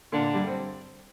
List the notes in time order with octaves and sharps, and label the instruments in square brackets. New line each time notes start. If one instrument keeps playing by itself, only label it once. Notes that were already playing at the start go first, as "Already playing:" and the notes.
[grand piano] A#2 A#3 [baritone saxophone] D3
[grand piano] G2 G3
C4